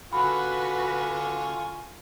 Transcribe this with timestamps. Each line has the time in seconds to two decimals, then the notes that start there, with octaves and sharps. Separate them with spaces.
0.13 D3 F4 F#4 B4 G#5 B5 C#6